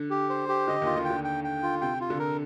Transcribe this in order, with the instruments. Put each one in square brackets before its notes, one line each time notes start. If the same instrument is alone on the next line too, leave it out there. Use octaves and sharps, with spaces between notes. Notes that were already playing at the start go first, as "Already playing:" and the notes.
Already playing: [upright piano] D3
[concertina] G4
C5
G4
[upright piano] D3 [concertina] D#5
[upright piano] D#2 D#3
[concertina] F4
[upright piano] D3
[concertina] G5
[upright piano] D3
[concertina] G5
G5
F4
[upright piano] C3 [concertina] G5
[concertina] F4
[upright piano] D3
[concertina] A#4